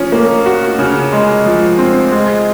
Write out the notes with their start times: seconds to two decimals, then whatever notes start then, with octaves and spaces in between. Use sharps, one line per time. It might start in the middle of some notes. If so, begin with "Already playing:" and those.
Already playing: F3 C#4
0.12 A#3
0.46 F#4
0.79 C#3
1.12 G#3
1.46 F3
1.79 C4
2.12 G#3